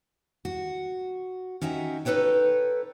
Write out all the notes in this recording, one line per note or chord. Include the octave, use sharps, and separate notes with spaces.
F#4
C#4 D#4 F#4 E5 G5
D#4 A4 B4 C#5 G5